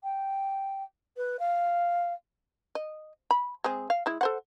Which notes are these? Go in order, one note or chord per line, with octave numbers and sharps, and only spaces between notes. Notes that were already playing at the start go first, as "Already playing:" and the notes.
G5
B4
F5
D#5
B5
G#3 C4 G#4
F5
G#3 E4
A4 C5 F#5